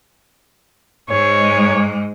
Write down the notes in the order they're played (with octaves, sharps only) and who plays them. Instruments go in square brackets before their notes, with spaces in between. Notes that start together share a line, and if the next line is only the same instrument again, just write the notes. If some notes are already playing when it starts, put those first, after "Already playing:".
[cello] G#2 G#3 [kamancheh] C#5